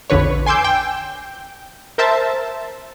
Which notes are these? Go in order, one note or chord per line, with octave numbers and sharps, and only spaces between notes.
A#1 F2 D3 B4 C#5
G#5 C6 D6 E6 G6
G5
A#4 C5 E5 A5